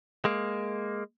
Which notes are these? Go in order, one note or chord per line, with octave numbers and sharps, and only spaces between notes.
G#3 A#3